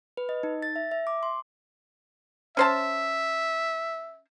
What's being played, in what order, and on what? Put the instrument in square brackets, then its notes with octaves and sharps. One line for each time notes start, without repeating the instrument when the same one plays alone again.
[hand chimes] B4
D#5
D#4
A6
E5
E5
D6
C6
[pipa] C#4 C5 A5 [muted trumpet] E5